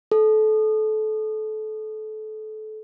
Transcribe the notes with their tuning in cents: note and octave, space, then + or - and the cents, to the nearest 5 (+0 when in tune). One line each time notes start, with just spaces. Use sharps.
A4 -25